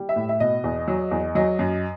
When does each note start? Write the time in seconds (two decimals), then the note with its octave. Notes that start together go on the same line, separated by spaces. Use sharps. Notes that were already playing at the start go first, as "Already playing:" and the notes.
Already playing: G3
0.09 E5
0.16 A2
0.29 E5
0.40 B2 D#5
0.64 E2
0.88 F#3
1.11 E2
1.35 F#3 D#5
1.59 F#2